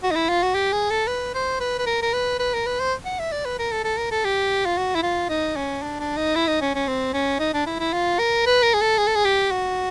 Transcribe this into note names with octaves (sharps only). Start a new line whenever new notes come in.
F#4
D#4
E4
F4
F#4
G4
G#4
A4
B4
C5
B4
B4
A#4
A#4
B4
B4
A#4
B4
C5
F#5
E5
D5
B4
A#4
A4
A4
A#4
A4
G4
F4
F#4
E4
F4
D#4
C#4
D4
D4
D#4
E4
D#4
C#4
C#4
C4
C#4
D#4
D4
E4
E4
F4
A#4
B4
A#4
G#4
A4
G#4
A4
G#4
G4
F#4